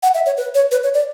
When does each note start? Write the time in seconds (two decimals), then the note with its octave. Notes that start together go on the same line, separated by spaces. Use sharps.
0.03 F#5
0.14 E5
0.26 C#5
0.37 B4
0.55 C#5
0.71 B4
0.83 C#5
0.94 D5